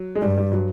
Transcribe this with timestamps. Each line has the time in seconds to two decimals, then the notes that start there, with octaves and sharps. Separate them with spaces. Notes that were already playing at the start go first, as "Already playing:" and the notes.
Already playing: F#3
0.15 G#3
0.22 G2 G3
0.37 G3
0.52 F#3